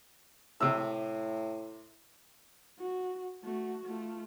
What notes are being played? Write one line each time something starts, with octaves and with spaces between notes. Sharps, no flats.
A2 C3 E6
F#4
A3 F#4
A3 F4